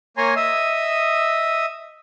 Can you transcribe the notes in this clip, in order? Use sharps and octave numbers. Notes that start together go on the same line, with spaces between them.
A#3 C#5 G#5 A#5 C6
D#5 E5 D#6 E6